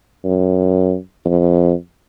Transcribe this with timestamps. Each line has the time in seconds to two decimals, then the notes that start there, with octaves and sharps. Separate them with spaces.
0.24 F#2
1.25 F2